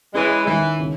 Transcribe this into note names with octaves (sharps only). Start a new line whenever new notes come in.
E3 G#3 C#4
D#3 E3
C#3